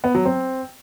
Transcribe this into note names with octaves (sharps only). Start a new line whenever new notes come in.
B3
F#3
C4